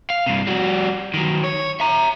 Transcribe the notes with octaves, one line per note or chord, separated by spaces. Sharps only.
F5
G2 C3
G3 F#4
D#3 F#3
C#5
E5 A#5